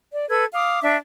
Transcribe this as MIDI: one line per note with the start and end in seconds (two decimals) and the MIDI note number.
0.12 0.29 74
0.29 0.44 69
0.29 0.44 71
0.29 0.44 88
0.29 0.44 92
0.53 0.80 77
0.53 0.80 86
0.53 0.80 87
0.82 0.96 62
0.82 0.96 76